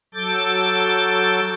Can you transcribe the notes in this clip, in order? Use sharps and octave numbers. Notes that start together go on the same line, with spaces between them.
F#3 A4 D6 G6 A6